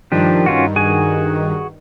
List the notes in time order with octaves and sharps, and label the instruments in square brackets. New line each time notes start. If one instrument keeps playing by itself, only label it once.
[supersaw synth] G2 D#3 [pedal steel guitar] F3 D4 G4
[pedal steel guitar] C#4 F4 F#4
F#4 G#4 G#5